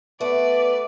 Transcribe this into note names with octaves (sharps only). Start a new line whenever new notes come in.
A3 B3 B4 D5